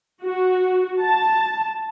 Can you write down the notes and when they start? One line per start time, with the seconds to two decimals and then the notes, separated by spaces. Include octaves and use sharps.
0.24 F#4
1.01 A5